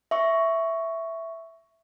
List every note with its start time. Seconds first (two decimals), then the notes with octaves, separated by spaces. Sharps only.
0.11 E5 C#6